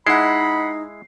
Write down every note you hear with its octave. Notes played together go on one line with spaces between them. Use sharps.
G#3 D#4 E4 F#5 B5 C7